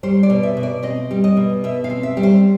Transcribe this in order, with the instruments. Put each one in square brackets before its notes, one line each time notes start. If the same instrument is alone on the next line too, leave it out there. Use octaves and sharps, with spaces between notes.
[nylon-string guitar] G3 C5
D5
B2
E5
B2
D5
C4 D#5
G3
D#5
B2
B2 E5
F5
C4
E5
G3
C5